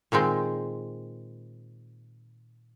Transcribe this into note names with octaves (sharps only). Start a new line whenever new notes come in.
A#2 D#3 G#3 C4